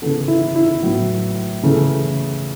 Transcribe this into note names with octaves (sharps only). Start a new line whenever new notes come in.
C#3 E3 B3 A4
E4
E4
A2 F#3 B3
C#3 E3 A3